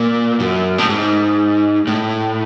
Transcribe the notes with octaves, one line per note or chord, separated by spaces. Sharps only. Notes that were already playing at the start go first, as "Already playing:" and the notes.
Already playing: A#2
F#2
A2
G#2
A2